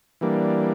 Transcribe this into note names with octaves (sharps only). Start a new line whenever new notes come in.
E3 G3 A#3 D4